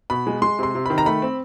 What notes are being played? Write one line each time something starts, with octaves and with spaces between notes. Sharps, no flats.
B2 B5
G#3
G#3 C6
C3 C6
C3
D#3 B5
A#5
A3 B5
C4